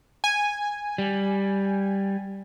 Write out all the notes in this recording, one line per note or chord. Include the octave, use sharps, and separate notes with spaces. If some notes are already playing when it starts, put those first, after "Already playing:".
G#5
G3